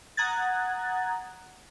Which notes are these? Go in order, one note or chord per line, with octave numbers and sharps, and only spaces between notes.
F#5 A#5 D#6 F#6 G#6 A6